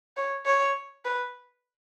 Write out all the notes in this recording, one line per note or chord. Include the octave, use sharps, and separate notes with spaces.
C#5
C#5
B4